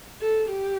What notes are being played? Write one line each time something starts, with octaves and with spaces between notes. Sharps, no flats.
A4
G4